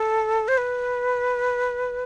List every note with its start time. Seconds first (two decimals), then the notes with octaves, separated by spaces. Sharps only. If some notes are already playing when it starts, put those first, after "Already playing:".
Already playing: A4
0.48 C5
0.58 B4